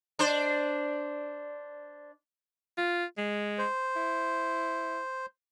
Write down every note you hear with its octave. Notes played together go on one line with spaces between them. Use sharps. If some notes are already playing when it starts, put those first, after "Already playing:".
D4 C5
F4
G#3
C5
E4